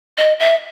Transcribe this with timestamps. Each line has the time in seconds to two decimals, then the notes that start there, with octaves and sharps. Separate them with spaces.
0.18 D#5
0.39 E5